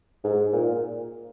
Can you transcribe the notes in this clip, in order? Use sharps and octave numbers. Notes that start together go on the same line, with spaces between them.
G#2
A#2